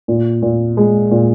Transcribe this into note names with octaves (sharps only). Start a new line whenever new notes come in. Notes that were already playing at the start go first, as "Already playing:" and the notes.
A#2
A#2
G#3
A#2